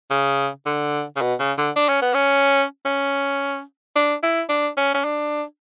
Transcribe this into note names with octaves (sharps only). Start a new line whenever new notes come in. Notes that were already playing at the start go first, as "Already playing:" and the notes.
C#3
D3
C#3
B2
C#3
D3
D4
C#4
B3
C#4
C#4
D4
E4
D4
C#4
C#4
D4